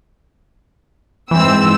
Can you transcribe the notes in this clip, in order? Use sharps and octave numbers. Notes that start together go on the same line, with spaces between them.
G#2 E3 C4 E6